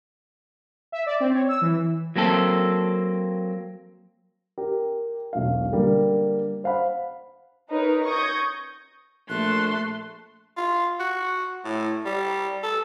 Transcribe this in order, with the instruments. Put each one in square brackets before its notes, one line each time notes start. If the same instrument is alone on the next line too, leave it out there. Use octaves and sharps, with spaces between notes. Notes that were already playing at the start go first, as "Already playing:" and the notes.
[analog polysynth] E5
D5
C4
C#5
E6
E3
[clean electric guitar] F#3 A#3 C4 A4
[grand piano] G4 A#4
E1 B1 F5
D3 G3 A#3 A#4
C5 F5 F#5 B5
[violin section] D#4 A#4 B4 C#5
C#6 D#6 G6 G#6 A#6
[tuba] A#1 [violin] A3 C6 [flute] F#6
[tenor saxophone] F4
F#4
A2
G3
A4